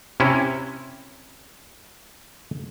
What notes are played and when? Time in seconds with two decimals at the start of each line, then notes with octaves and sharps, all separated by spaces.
0.20 C3 C#4 E4